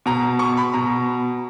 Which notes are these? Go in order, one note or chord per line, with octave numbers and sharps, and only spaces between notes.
B2 A#5
C#6
B5
B2 A#5